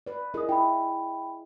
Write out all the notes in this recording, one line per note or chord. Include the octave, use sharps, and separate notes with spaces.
B4 D5
E4 G#4 A#4 D#5 D#6
E4 G5 B5